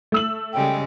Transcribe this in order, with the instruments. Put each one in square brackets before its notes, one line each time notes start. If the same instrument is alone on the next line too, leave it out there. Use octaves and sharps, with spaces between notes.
[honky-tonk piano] A3 E6 F#7
[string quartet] C#3 G3 G#3 [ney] G5